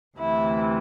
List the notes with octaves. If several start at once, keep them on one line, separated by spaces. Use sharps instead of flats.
D2 C3 E3 E4